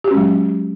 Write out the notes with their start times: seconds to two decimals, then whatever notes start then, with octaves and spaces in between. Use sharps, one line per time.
0.04 G4
0.08 F#4
0.11 C#4
0.14 G#3
0.17 F#3